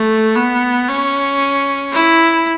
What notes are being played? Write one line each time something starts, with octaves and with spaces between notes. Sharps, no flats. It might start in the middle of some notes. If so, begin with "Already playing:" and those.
Already playing: A3
B3
C#4
E4